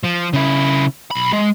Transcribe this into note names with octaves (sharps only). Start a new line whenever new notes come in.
F3
C#3 E4
B1 B5
G#3